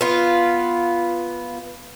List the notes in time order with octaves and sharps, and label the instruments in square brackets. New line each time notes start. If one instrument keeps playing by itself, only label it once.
[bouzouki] B3 F4